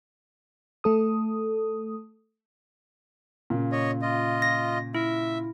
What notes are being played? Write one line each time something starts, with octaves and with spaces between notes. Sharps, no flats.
A3 A4 D#6
A#2 C#3
C#5 D#5
F4 D#5
A#6
E4 E5